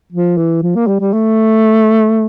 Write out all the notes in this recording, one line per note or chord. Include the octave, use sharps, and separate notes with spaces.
F3
E3
F3
A#3
G3
G3
A3